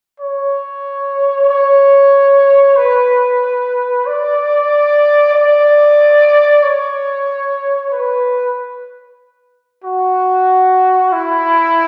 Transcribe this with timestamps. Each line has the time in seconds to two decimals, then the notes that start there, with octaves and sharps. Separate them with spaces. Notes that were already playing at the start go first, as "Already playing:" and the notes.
0.20 C#5
1.49 C#5
2.77 B4
4.06 D5
5.34 D5
6.63 C#5
7.92 B4
9.84 F#4
11.13 E4